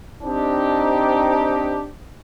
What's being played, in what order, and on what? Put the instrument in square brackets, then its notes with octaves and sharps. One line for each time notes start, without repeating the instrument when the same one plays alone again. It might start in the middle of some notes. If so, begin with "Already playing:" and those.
[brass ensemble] C4 D4 D#4 G4